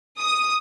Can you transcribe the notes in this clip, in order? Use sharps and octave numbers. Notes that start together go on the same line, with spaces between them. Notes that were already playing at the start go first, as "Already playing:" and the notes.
D#6